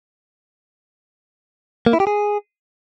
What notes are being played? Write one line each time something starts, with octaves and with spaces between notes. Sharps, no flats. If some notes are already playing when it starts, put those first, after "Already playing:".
A#3
E4
G4
G#4